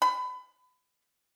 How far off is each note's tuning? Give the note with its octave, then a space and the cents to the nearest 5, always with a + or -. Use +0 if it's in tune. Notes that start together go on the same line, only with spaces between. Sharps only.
B5 +30